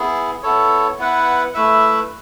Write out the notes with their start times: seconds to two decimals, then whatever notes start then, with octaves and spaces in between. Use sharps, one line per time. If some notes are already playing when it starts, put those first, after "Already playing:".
Already playing: B3 E4 G#4
0.43 B3 E4 A4 C#5
0.98 B3 E4 B4 F#5
1.54 A3 E4 B4 E5